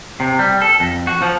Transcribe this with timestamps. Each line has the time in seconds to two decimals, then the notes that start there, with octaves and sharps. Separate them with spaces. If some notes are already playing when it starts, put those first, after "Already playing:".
0.20 C3
0.39 G3
0.62 A4
0.80 F2
1.07 F#4
1.22 F3